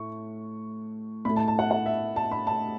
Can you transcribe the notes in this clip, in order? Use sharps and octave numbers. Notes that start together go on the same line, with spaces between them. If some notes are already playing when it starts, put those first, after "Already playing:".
Already playing: A2 A3 C#6
A2 A3 B5
A5
A5
F#5
F#5
E5
A5
B5
A5